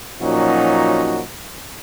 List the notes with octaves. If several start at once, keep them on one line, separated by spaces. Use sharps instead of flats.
A#2 F3 F#3 C#4 D#4 F#4